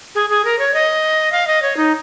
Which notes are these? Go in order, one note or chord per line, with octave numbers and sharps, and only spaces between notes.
G#4
G#4
A#4
C#5
D#5
F5
D#5
C#5
D#4